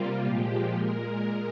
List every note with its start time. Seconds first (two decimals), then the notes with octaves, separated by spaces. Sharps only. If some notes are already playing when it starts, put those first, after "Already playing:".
Already playing: C3 G3 A#3 F4
0.24 A#2 F3 G#3 G4
0.76 A#2 G#3 A#4